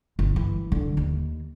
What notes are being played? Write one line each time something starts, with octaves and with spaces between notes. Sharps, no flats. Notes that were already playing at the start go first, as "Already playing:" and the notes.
G1
E3
D3
D#2